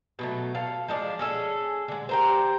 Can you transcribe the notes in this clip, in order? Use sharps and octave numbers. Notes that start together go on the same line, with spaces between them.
B2 F#3 A3
A4 F5
F3 G#3 D4
C#4 G#4 A4
D3 G#3
G4 A#4 C5